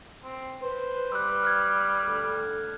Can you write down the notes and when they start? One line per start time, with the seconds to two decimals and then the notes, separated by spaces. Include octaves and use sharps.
0.24 C4
0.62 B4 C5
1.12 G3 E6 F#6
1.43 F6 F#6 G#6
2.04 D2 A4